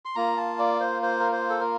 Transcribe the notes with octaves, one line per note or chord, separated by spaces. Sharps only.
C6
A#3 F4 A#5
A5
D5
C5
C5
A#4
C5
A4
A#4